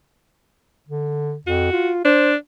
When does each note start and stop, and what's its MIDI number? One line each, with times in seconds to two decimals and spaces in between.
0.89 1.35 50
1.47 1.72 41
1.47 1.91 66
1.72 2.01 65
2.05 2.35 62
2.05 2.31 72